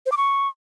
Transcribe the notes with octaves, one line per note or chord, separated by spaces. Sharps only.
C5
D6
C#6